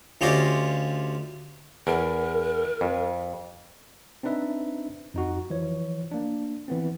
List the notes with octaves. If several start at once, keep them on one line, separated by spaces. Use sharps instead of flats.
D2 C#4 F4 G4 D5 D#5
E2 A#4
F2
C4 D4 D#4 B4 E5
F2 D#4 F#4
E3 F3 C#5
A#3 D4
E3 B3 C4